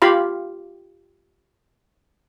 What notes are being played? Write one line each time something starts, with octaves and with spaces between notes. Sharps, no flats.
F4 G4 F5 B5